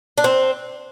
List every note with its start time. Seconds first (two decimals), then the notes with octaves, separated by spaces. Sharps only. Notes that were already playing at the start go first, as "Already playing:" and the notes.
0.18 D4
0.24 C4